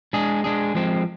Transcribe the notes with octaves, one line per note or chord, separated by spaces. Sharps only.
G#3 D4 G#4
G#3 D4 G#4
F3 G#3 C4